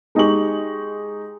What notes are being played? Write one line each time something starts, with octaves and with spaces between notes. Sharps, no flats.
G#3 D#4 G4 G#4 C#6 F#7